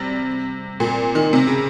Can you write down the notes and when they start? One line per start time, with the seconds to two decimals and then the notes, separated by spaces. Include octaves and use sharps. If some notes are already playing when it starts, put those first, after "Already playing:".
Already playing: C3 G3
0.80 A#2
1.15 D#3
1.33 C3
1.47 C#3